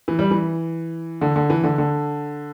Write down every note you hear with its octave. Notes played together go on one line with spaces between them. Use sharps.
E3
G3
E3
D3
D3
E3
D3
D3